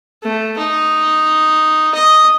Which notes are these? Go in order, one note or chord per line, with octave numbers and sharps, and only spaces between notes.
A3
D#4
D#5